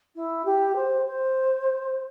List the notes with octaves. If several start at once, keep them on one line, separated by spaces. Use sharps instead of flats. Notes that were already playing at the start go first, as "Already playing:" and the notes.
E4
G4
C5
C5